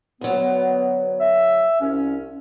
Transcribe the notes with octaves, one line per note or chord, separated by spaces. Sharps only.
D2 F#3 B3
E5
C2 C#4